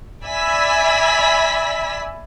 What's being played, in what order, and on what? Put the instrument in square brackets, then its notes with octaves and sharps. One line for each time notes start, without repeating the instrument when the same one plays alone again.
[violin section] D5 E5 G#5 B5 E6 B6